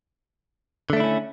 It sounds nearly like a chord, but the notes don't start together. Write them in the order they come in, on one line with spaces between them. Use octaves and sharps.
D3 A3 D4 E4 C#4